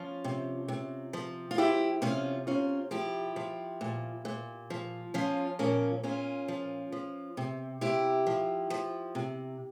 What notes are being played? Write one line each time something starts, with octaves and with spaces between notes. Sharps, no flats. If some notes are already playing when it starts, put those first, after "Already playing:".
Already playing: F3 C#4 F4
C3
C3
F3
F4
F3 E4 G4
C3 C#4 F4
C3 C#4 F4
F3 E4 G4
F3
A#2
A#2
F3
F3 C#4 F4
A#2 A#3 C#4
A#2 C#4 F4
F3
F3
C3
C3 E4 G4
F3
F3
C3